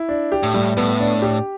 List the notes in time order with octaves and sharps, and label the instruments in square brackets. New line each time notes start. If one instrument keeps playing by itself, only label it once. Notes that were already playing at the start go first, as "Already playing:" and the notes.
Already playing: [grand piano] E4
D4
G4
[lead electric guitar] A2
[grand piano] G3
[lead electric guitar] A2 [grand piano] B3
[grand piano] D4
G4